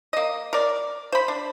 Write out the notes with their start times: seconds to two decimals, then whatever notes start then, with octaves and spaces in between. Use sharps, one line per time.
0.13 A#3 D#5
0.53 A#4 D5
1.12 C5 B5
1.28 D4